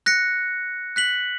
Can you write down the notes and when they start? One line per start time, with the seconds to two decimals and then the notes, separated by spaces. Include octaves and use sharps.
0.06 F#6 A#6 C#7
0.96 F#6 B6 F#7